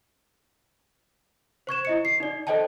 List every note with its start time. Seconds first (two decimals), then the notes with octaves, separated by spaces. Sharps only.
1.67 C5 C#6 G#6 E7
1.85 E4 D#5 C#7
2.05 C7
2.20 D#4 D5
2.47 A4 C5 D5 D#5 G5 A5